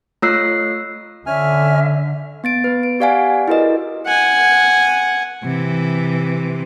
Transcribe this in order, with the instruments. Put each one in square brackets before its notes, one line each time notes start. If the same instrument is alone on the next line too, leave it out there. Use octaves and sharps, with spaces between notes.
[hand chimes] A3 F4 C#5 E6 F#6 C7
[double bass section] D3 [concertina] C#4 G#5 F6 [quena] E5
[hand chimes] B3 A6 D7
B3 B4
D7
G4 D5 F5 F#5 G#5
E4 F#4 G#4 A#4 B4 D#5
[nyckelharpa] F#5 G#5
[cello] C3 E3